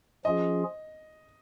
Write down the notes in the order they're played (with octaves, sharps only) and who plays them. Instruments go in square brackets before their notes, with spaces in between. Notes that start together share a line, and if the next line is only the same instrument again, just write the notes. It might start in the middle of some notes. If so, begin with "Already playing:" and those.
[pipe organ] F3 C#4 F4 G#4 [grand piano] D#5